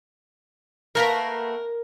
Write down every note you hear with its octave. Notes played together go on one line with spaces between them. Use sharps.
A3 A#3 F#4 A#4 B4 A5 A#5